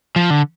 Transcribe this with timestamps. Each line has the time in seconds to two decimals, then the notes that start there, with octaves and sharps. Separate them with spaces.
0.16 F3
0.30 D3